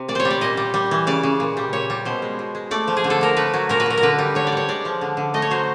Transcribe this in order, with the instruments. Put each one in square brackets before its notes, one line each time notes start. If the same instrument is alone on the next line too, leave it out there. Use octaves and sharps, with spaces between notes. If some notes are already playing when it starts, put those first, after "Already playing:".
Already playing: [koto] C3
A#2 D5
C5 C#5
G3
D5
A#2 D#5
G3
G3
E3
C#3 D5
C#3
A#2
G3
A#2 C#5
G3
B2 C5
G#3
B2
G#3
A3 D5
F3
G#4
D3
A4
D3 A#4
A3 B4
F#3
A#2 A#4
B4
A#2 A#4
A#4
D3 B4
G3
D3 C#5
D5
G3 C#5
G#3 D5
F3
D3
D3
A3 D#5
C#5
F#3 C5